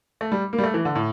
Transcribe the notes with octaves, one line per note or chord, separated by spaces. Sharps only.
A3
G3
A#3
G3
A3
E3
D3
A2